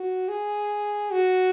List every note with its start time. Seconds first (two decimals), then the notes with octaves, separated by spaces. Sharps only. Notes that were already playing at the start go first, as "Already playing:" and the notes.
Already playing: F#4
0.28 G#4
1.11 F#4